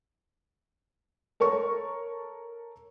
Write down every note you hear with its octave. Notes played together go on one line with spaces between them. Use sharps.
A4 A#4 C#5 C#6